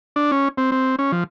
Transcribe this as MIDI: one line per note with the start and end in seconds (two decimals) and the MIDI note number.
0.16 0.31 62
0.32 0.48 61
0.57 0.70 60
0.72 0.96 60
0.99 1.12 61
1.12 1.24 53